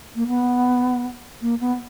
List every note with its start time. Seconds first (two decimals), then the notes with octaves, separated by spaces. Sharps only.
0.15 A#3
0.27 B3
1.41 A#3
1.60 B3